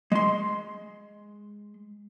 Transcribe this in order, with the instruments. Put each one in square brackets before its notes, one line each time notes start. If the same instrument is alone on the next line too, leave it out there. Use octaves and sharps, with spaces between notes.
[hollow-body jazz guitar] G#3 C6